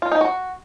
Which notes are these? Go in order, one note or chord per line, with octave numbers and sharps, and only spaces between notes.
F4
D#4
F#4